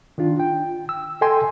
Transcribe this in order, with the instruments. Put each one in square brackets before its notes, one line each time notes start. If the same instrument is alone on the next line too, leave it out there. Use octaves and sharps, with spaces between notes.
[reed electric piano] D#3 D4 F4
G5
E6
A4 D#5 G5 G#5 C6